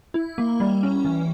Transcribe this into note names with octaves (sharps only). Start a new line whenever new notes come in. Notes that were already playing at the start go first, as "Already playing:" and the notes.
E4
A#3
G3
C#4
E3